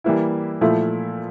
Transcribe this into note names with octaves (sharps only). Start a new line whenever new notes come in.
E3 G3 A#3 E4
A#2 F3 A3 E4